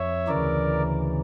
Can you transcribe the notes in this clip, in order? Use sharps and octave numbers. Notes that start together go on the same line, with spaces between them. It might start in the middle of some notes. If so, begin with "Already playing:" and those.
Already playing: F2 C#5 E5
D2 C#3 E3 A#4 D5